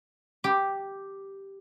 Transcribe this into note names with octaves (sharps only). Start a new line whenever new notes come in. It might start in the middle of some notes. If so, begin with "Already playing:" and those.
G4